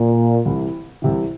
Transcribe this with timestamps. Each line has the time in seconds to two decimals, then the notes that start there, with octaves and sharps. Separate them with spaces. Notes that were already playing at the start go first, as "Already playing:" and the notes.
Already playing: A#2
0.45 C2 C3 E3
1.02 C2 C3 E3